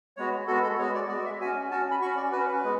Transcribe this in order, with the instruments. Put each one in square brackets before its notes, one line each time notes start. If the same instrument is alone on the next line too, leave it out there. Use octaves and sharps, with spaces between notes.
[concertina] G#3 B3 F#4 C#5
G#3 B3 F#4 A4
A4
G#3 B3 F#4 C#5
D5
G#3 B3 F#4 D5
E5
C#4 F#4 G#5
C#4 F#4 A5
B5
F#4 C#6
C#4
D5
F#4 B4
C#4
B4
G#3 B3